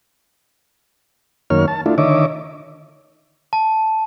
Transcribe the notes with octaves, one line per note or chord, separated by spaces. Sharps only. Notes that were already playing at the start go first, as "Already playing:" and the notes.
F#2 D#3 A#3 C#5 F6
A5
A3 D4 E4 F4
D3 D#3 C#5 D#5 E5 D6
A5